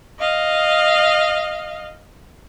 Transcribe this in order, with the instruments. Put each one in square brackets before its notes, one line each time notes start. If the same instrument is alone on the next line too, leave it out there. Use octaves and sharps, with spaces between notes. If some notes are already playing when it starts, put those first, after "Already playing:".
[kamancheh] D#5 F5